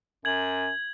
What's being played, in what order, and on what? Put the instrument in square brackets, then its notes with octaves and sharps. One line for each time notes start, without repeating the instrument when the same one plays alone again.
[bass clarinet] F#2 [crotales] G#6 F#7